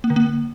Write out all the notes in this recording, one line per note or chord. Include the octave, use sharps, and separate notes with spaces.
A#3
D3
A#3